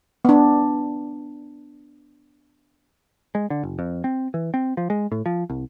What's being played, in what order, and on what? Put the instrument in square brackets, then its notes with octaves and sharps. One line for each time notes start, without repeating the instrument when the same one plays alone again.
[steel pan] B3 D4
[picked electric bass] G#3
D3
F#1
F2
C4
E3
C4
F3
G#3
A2
F3
C2